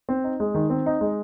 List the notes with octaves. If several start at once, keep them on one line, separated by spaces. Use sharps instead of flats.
C4
D#4
G#3
D#3
C4
D#4
G#3